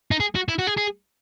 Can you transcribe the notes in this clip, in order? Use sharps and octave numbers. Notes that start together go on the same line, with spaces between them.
D#4
G#4
F#4
E4
F#4
G#4
G#4